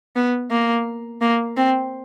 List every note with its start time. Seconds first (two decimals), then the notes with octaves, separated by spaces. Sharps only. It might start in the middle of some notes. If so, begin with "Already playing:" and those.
0.16 B3
0.51 A#3
1.21 A#3
1.57 C4